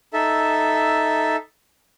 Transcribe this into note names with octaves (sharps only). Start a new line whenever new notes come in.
D#4 A4 E5